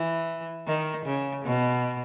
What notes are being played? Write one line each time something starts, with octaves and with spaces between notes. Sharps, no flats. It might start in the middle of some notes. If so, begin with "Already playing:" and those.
Already playing: E3
D#3
C#3
B2